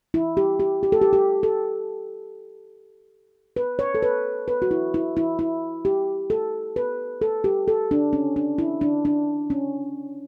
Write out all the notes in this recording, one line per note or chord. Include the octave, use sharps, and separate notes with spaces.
E4
G4
G4
G4
A4
G4
G4
A4
B4
C#5
A4
B4
B4
F#4
E4
E4
E4
E4
G4
A4
B4
A4
G4
A4
D4
C#4
D4
E4
D4
D4
C#4